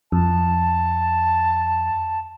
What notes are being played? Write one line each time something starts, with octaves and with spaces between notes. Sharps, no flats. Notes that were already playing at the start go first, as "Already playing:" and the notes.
F2 A5